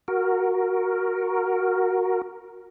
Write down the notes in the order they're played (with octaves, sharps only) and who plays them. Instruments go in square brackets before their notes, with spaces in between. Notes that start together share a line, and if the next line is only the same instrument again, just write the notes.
[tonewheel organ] F#4 A#4